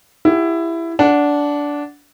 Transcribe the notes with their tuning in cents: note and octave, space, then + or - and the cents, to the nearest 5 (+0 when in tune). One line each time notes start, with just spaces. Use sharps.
E4 +15 G4 +25 F#5 +0
D4 -15 F#5 +0